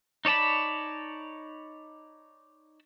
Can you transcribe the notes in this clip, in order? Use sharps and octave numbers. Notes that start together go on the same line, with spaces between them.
D#4 C#5 D5 A5 B5